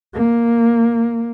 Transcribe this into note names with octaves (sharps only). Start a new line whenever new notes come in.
A#3